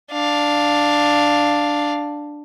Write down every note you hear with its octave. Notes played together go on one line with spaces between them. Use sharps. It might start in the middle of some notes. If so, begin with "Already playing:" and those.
D4 F5